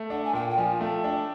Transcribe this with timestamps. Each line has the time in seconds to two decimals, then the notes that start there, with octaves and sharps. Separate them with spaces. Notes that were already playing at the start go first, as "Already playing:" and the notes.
Already playing: A3
0.10 D4 F#5
0.24 G#5
0.33 A#2 G5
0.49 G5
0.57 F3 G#5
0.81 A3 G5
1.04 D4